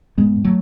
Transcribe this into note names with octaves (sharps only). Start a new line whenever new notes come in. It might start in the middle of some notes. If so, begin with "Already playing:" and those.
G#2 G#3 B3
G#2
F#3 A3